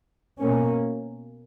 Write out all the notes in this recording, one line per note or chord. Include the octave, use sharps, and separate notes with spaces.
B2 A#3 C#4